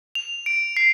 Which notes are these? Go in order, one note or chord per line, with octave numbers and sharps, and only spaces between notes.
F7
D7
C7